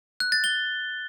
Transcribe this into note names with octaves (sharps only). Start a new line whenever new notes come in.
F#6
A6
G7